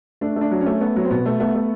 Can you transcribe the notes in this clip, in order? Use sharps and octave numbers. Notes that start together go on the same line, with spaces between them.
A3 D4
A3
D4
F#3
C#4
A3
A3 B3
F#3
C4
B2 B3
A3
A3 B3
A3